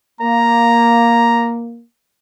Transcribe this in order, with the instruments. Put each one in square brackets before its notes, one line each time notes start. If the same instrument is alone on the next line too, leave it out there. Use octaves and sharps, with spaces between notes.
[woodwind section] A#3 [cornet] A#5